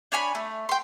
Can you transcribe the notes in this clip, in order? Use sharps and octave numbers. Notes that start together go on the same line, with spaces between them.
D4 C#5 G#5 B5
A3
G5 C6